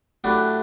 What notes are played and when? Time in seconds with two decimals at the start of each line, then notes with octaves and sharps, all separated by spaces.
0.24 A2 F#3 A3 D4 G4 B4